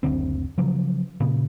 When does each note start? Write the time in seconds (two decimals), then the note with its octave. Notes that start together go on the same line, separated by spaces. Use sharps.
0.03 F#1 D2 D3 C4
0.58 C#3 F3 F#3
1.20 A#2 C#3